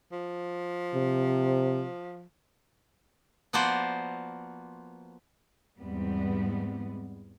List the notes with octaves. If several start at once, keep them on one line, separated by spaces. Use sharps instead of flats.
F3
C3
F3 A#3 B3 F#4 C5 D5
E2 G#2 G3 B3 C4